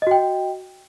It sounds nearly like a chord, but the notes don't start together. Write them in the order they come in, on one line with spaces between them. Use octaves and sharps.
D#5 F#4 G5